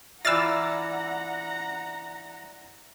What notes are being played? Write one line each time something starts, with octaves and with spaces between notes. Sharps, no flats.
E3 F4 D5 E5 F#5 A#5 E6 A6